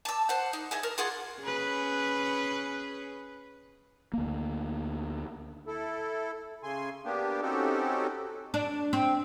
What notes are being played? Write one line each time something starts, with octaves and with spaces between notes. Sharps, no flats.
A5 E6
C5 F#5
D#4
D#4 E4 G#4
A#4
F4 G#4 F#5 C6
C#4 G#4 B4
D2 A#3
E4 A4
C#3 G#5 C6
A#3 B3 D4 G4
C4 C#4 D#4 F#4 G4 A4
D4
C4